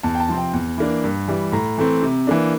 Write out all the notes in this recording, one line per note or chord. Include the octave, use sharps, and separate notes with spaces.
E2 A5
G5
A5
C3 F3 C4
G5
E2
E3 A#3 D4
G2
E3 G3
A2 A#5
E3 A3 C4
C3
E3 A#3 D4